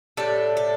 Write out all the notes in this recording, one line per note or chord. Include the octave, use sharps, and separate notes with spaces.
A2 G3 D4 A4
A4